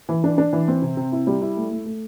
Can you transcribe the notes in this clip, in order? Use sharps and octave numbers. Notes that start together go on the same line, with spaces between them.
E3
D4
D4
E3
C4
C3
C3
E4
G3
E4
A3
A3
A3